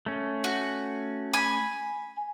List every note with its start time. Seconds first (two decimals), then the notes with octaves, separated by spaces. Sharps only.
0.06 A3 C#4
0.44 F#4
1.34 G#5 B5